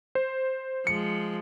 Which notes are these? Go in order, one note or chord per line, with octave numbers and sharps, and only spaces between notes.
C5
F3 G#3 C#7